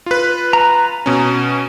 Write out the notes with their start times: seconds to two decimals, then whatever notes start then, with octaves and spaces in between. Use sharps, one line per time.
0.06 F4 B4
0.53 A#5
1.06 B2 C#4